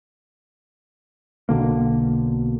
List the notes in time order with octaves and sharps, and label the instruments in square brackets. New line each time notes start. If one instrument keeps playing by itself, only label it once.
[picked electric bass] B1 B2 D3 A#3